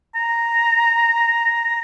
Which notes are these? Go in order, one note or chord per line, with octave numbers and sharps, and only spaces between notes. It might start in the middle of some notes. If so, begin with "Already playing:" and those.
A#5